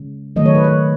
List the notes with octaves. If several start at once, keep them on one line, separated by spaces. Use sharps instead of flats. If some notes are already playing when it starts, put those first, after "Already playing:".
Already playing: C#3 G#3
D#3 F#3 A3 D#5
C#5
B4
C#5